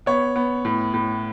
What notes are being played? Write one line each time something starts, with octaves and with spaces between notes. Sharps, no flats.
B3 C#5
B3
A2
A2